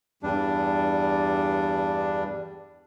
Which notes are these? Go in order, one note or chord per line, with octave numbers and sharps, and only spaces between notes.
E2 G2 G3 D4